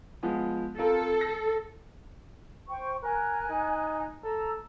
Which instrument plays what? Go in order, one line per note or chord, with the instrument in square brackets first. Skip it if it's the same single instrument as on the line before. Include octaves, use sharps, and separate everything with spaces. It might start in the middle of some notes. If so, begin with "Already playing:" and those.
[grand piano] F3 G#3 B3
[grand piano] C4 F4 A#4 [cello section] A4
[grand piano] A#6
[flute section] C5 G5 C#6
[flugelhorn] A#4 [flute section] G#5 F#6
[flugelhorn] D#4
[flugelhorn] A4 [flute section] A#5 E6